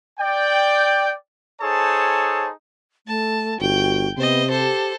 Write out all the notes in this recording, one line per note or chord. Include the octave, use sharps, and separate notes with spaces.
D5 G5
D#4 G#4 A4 C5 C#5 A5
A3 A5
G1 F#4 G5
C3 B3 C5 D#5
G4 A4 C5